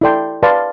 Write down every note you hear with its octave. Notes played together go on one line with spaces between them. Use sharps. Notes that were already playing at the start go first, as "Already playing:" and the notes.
E4 A4 D5 G5 C6
B4 D5 F5 A5 C6